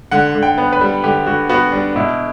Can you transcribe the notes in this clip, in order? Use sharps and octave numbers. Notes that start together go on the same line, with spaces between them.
D3 F#5
D3
G5
B3
B4
G3
D3 G4
D3 F#4
B3 F#4
G3 D4
B2 E4